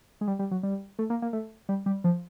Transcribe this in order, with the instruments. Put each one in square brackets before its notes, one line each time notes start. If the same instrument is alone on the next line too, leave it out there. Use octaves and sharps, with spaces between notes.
[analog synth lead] G#3
G3
G3
F#3
G3
A3
A#3
A#3
A3
G3
G3
F3